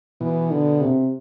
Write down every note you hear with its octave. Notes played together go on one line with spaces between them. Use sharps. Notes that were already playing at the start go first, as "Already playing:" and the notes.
B2 E3
D3
C3